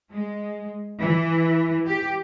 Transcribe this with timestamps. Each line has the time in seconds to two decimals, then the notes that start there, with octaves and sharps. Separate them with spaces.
0.13 G#3
0.98 E3
1.87 G4